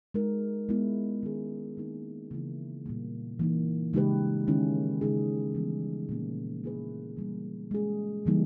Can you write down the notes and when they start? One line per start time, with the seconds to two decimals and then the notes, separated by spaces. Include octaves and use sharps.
0.14 G#3 D#4 A#4
0.69 G#3 B3 E4
1.23 D#3 G#3 C#4 G#4
1.77 D#3 A#3 D#4
2.31 C#3 E3 A#3 E4
2.86 A#2 G3 A#3
3.39 E3 A#3 D#4
3.93 C#3 G#3 D#4 G4 B4
4.47 D#3 G#3 C#4 E4
5.01 C#3 G#3 D#4 G#4
5.55 E3 G3 B3
6.09 A#2 A#3 C#4
6.64 A#3 E4 G#4 B4
7.17 E3 G3 A#3
7.71 G#3 C#4 G#4
8.25 C#3 E3 G3 A#3 D#4